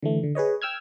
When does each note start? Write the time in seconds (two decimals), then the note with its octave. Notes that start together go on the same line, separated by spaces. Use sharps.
0.03 D3 E3 A3
0.23 D3
0.35 G#4 B4 C#5 D#5
0.62 G5 E6 F6 G#6